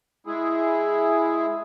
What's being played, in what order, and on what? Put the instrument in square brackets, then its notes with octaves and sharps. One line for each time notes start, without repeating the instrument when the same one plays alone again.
[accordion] G#3 E4 G#4